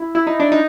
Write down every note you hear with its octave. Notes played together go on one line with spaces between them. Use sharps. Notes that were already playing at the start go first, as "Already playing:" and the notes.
Already playing: E4
E4
D#4
D4
D#4